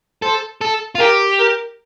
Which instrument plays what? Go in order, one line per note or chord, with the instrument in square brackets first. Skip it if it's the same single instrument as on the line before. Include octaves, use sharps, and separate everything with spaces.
[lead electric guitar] A4 [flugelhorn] C5
[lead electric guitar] A4
F4
[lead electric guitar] G4 [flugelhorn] A#4
[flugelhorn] A#4